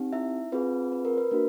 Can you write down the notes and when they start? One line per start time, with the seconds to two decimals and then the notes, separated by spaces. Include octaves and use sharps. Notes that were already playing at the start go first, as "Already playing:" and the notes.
Already playing: C4 D#4 G4
0.13 E4 E5
0.52 C4 F4 G#4 B4
0.92 B4
1.05 A#4
1.18 B4
1.31 A#3 D4 F#4 A#4